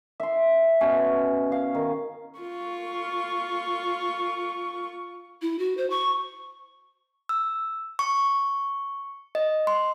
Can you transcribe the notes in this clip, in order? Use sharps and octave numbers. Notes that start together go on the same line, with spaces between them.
E5 C6
B2 C#4
F5
D#3
F4 C#6
E4
F#4
C5
C#6
E6
C#6
D#5
C6